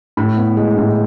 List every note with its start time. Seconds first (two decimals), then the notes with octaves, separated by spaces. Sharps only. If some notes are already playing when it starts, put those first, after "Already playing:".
0.17 A2 B5
0.37 B3
0.57 G#3
0.77 A2